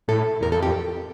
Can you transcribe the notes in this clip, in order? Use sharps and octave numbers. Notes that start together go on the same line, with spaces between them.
A2 A4
E2 A#4
F2 A4
G4